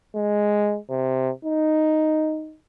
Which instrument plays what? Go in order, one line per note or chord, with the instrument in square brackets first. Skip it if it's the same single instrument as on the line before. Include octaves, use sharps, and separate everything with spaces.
[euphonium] G#3
C3
D#4